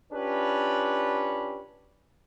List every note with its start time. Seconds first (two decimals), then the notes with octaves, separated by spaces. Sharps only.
0.13 C#4 D4 F4 G4 B4